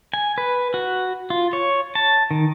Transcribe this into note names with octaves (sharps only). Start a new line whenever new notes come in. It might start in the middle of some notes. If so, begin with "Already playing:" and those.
G#5
B4
F#4
F4
C#5
A5
D#3